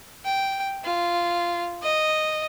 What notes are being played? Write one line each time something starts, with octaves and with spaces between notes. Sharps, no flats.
G5
F4
D#5